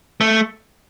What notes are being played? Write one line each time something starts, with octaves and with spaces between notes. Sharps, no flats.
A3